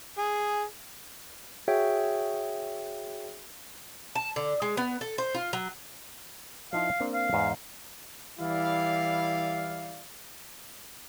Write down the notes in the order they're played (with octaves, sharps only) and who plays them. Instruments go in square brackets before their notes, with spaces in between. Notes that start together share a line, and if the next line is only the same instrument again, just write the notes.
[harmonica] G#4
[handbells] F#4 G#4 C#5 E5 G5
[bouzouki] A5
D3
G#3
B3
A4
C5
F4
F#3
[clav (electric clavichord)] F3 D#4 E4 [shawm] F5
[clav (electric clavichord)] A#3 C4 D4
[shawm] F5
[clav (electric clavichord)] E2 G#2
[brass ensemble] E3 G3 E4 D5 F5